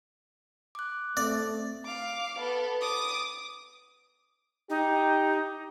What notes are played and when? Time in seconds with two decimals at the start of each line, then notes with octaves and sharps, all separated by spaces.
0.75 D6 F#6
1.17 A3 C4 D5
1.85 F5 D6
2.39 B3 A4
2.81 D6 D#6
4.70 D#4 G4